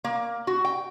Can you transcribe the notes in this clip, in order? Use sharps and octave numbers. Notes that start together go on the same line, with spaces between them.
A#3
F#4
G5